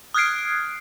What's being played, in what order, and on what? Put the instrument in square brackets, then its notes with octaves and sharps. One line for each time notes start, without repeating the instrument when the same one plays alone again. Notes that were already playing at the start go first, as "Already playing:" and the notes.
[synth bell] D#6 F6 F#6 G#6 C7 D7